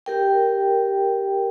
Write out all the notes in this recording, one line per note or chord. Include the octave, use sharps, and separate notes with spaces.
G4 A#4 G5